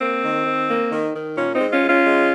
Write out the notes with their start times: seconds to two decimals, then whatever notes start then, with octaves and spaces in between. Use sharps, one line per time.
0.01 A#3 C4
0.23 D#3
0.46 D#3
0.69 A#3
0.92 D#3
1.15 D#3
1.37 A#2 C#4
1.54 C4 D#4
1.60 G#3
1.71 C#4 F4
1.82 G#3
1.88 C#4 F4
2.05 G#3